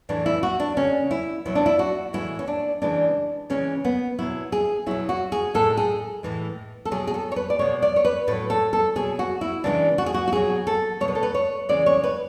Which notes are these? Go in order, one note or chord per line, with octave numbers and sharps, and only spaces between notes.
A2 E3 G#3 D4
E4
F#4
D4
C#3 C#4
G#3
E4
B2 F#3 E4
D4
E4
F#4
A2 E3 G#3 E4
C#4
D4
C#3 E3 G#3 D4
C#3 E3 G#3 C#4
B3
B2 F#3 E4
G#4
B2 F#3 E4
F#4
G#4
A2 G#3 A4
G#4
A2 E3 G#3
A4
B2 F#3 G#4
G#4
A4
C#5
B4
D5
B2 G#3 C#5
D5
C#5
B4
A2 F#3 B4
A4
A4
B2 F#3 G#4
F#4
E4
C#3 E3 G#3 D4
F#4
G#4
F#4
F#4
B2 F#3 G#4
A4
B2 G#3 C#5
B4
A4
B4
C#5
C#3 E3 G#3 D5
C#5
B4